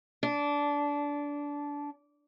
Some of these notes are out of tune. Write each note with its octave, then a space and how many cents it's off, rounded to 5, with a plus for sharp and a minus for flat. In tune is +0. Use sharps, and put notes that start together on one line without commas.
D4 -20